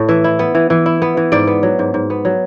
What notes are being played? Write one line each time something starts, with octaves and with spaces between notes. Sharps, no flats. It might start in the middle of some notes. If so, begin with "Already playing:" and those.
Already playing: A2 A3
E3 E5
E4
B3
E3
E3
E4
B3
E3
G#2 D5
B3
F#3
G#2
G#2
B3
F#3